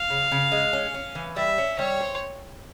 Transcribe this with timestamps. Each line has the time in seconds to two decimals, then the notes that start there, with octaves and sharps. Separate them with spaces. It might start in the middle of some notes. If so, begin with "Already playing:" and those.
Already playing: F5
0.10 C#3
0.32 C#3
0.52 G#3
0.73 C#4
0.94 C#4
1.15 E3
1.36 G3 E5
1.58 C#4
1.79 G3 C#5
2.01 C5